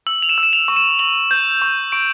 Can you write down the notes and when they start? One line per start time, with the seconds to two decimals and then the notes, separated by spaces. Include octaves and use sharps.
0.07 E6 F#7
0.22 F7
0.29 E7
0.38 E6
0.43 E7
0.53 F7
0.68 C#6
0.76 E7
0.99 C#6 F#7
1.31 G6
1.62 C#6
1.92 C#6 D7